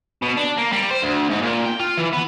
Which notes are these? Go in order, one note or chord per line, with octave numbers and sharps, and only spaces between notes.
B2
D4
A#3
G3
C5
D2
G#2
A#2
G5
F4
E3
B3